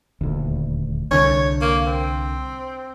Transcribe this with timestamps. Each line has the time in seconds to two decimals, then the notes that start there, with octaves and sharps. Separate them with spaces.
0.21 D#1 D2
1.11 C2 D3 C#5
1.62 A#3
1.87 C4